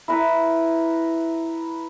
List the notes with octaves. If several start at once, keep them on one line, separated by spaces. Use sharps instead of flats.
E4 A#4 B4